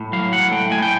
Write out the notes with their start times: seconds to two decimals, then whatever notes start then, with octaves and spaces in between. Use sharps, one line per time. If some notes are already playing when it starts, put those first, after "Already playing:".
Already playing: A2
0.12 F#3 F5
0.32 A2 F#5
0.52 A3 G5
0.71 A2 G#5
0.82 G5